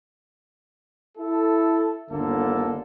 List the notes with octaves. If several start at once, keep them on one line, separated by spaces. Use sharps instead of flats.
E4 A4
G1 D#2 D3 A#3 A4